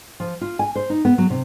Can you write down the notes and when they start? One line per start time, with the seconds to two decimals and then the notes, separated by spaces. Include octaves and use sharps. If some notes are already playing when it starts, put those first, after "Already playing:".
0.20 F3
0.41 F4
0.59 G#5
0.76 C5
0.90 D#4
1.05 B3
1.18 F#3
1.30 C3